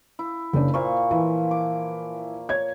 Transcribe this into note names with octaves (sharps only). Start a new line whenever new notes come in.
E4
F#1 C#3 D4 G5
A#2 C5 F5 C#6
E3 F3
D6
C#5 G#6